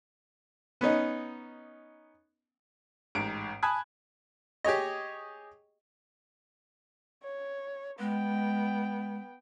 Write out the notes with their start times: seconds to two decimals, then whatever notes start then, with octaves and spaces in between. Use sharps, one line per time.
0.81 B3 C#4 D#4
3.15 A1 G#2 D7
3.63 G#5 A5 B5 D#6 F#6 G#6
4.65 G4 G#4 C#5 D#5
7.23 C#5
7.99 G#3 B3 G5